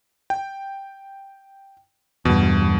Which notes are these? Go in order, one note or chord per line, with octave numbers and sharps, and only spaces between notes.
G5
E2 G2 B2